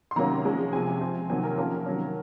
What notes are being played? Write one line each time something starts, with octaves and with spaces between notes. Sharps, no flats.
C6
C3 D#3 F#3 A#3 C#4 A#5
F3 G#3 C#4
C3 F3 C4 G#5
F3 C4
C3 D#3 F#3 C4 G#5
A#4
F3 A#3 C#4 A#4
D#3 F#3 C#4